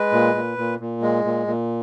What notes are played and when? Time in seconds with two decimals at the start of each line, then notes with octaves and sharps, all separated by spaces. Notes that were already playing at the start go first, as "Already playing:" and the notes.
Already playing: G#3 B4
0.12 A#2
0.35 A#2
0.58 A#2
0.80 A#2
1.02 G#3
1.24 A#2
1.47 A#2